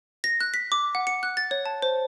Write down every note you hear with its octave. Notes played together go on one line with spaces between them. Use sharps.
A#6
F#6
B6
D6
F#5
C#7
F#6
A6
C#5
A5
C5